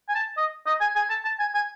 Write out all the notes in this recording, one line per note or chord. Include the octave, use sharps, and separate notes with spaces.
G#5
A5
D#5
D#5
G#5
G#5
A5
A5
G#5
G#5